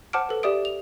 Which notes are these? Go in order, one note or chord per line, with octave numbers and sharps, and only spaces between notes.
C5 F#5 A5 D6 F6 D7
A4 B4
G4 D5 E5 D#6 D7
F7